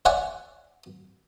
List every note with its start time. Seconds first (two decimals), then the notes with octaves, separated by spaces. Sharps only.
0.05 C#5 D5 E5 F#5 G#5 C#6